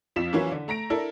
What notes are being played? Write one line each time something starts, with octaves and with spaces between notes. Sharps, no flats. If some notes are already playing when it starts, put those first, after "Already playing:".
F2 F3 F4 B6 E7
E3 F#3 A#3 C#4 E4 F4
D3
A3 A#5 A#6 D7
D4 E4 A4 A#4